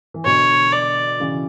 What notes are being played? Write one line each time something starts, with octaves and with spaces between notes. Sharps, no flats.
E3
B2 D3 C#5
D5
C#3 E3